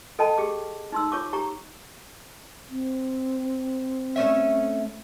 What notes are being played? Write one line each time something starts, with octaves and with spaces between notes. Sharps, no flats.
A4 D#5 G5 A5 B5
G4 G#4 D6
D#4 C6 E6
F4 C#5 C#6 D6
G4 A#5 C#6
C4
A3 C#4 E5